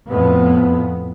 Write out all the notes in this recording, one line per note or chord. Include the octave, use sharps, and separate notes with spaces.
F2 A2 B3